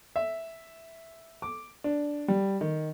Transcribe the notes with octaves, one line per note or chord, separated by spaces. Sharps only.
E5
D6
D4
G3
D#3